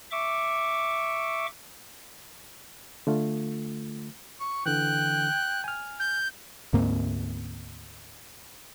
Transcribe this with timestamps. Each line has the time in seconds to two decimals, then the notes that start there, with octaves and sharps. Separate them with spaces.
0.11 E5 C#6 D6
3.07 D3 A3 F4
4.40 C#6
4.66 D3 E3 G5 F#6
5.64 G#5 F6
6.00 G6
6.73 D2 G#2 A#3 C4